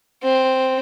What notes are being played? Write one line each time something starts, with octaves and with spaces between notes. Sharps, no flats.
C4